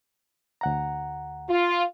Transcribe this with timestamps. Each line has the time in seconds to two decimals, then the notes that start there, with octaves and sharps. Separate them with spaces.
0.61 D2 F#5 A#5
1.50 F4